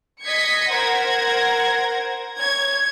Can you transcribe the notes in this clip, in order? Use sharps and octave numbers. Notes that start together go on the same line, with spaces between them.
D#5 G#6 B6 C#7
A#4 C5 F#5 G#6 A#6
C#5 G#6